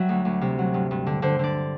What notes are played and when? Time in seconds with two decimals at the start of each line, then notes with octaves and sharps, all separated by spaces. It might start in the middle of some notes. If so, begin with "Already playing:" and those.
Already playing: F#3 G3 E5
0.09 D2
0.25 D2
0.41 C3
0.58 F#3
0.74 G2
0.91 G2
1.06 D3
1.22 D3 C5
1.39 D3 D5